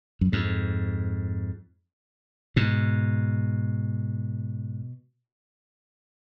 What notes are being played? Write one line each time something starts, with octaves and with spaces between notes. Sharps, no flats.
F#2
F2 G#2
G#2 B2